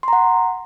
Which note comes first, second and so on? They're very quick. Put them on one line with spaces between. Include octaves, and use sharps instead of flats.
C6 A#5 F#5